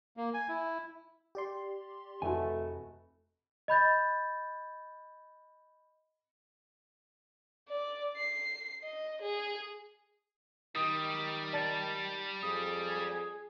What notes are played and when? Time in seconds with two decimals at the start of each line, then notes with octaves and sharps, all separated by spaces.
0.17 A#3
0.34 G#5
0.49 E4
1.35 G4 D5 C6
2.22 F1 E3 A3 F#4 G#5
3.68 D#5 B5 G6 A6
7.69 D5
8.17 C7
8.84 D#5
9.22 G#4
10.76 D#3 G3 D#6
11.53 D5 A5 A6
12.43 F2 G#4 D#6